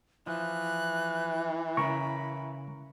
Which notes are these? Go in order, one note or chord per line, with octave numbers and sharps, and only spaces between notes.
E3 F3 F#6
C#3 A#4 B5 C#6